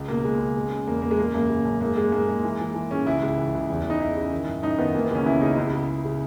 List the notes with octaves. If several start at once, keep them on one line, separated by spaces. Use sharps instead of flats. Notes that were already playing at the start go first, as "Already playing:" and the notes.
Already playing: C#2
B2 A#3
C#2 G#3
C#2
C#3
C#3
E2 A#3
E2 A#3
G#3
C#3 A#3
F#2 A#3
C#3
F#2
G#2 A#3
G#2 G#3
G#2 A#3
G#2
E3
E3
E3
G#2 C#4
C#2 E4
C#2
E3
C#2
E2
E2
D#4
E2 E4
C#3
D#3
F#2
F#2 D#4
D#3 B3
E3 A#3
B3
C#2
C#4
C#2 E4
C#3 D#4
C#2 E4
C#3
C#2
C#3